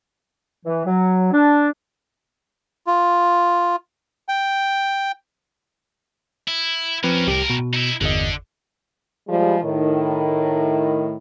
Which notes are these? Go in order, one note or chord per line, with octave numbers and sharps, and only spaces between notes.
E3
F#3
D4
F4
G5
E4
F3 C4 C#4 A#4 B4
C2 A2 G4 A#4
B2
D#4 E4
G1 E2 D3 D#5
F3 G3 G#3
A2 D#3